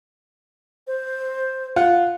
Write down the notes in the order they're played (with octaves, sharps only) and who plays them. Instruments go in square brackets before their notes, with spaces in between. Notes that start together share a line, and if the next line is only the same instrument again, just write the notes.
[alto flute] C5
[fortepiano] F4 F#5